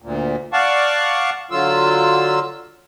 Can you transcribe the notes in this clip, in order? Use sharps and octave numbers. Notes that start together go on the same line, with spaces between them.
D2 A#2
D5 F5 F#5 A5 C#6
D3 F#3 F4 E6